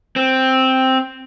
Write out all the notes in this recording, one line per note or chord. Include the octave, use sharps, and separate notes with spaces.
C4